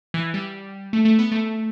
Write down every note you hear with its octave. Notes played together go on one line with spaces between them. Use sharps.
E3
G3
A3
A3
B3
A3